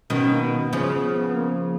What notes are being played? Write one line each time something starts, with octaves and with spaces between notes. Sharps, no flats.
B2 D#3 C#4
A#3
B3
B3
C#3 F3 C#4
B3
B3
B3
A#3